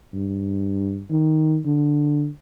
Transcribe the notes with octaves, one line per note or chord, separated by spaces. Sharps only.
G2
D#3
D3